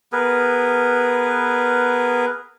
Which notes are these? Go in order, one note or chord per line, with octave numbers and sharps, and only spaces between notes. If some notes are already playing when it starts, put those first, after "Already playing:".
B3 G#4 A#4 B4